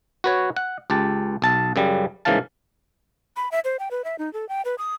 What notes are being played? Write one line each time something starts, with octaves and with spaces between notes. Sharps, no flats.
F#4 B4 C#5
F#5
C#2 G4 A5
B1 A5
F#2 C#3 G3
G#2 C#3 E3 A#3 F5 A5
B5
E5
C5
G5
B4
E5
D#4
A4
G5
B4
D#6